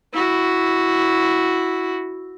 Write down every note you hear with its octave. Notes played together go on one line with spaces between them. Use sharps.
E4 F#4